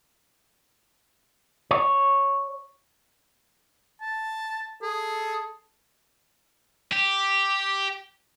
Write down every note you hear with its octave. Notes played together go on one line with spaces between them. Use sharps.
C#5
A5
G#4 A4
G4